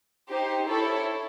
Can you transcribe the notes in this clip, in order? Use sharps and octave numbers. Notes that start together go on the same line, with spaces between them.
D#4 G4 C5
E4 A4 C#5